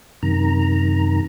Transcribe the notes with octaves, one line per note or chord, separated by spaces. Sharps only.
F#2 C3 D#3 A#5